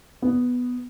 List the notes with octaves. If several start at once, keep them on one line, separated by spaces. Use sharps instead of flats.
B3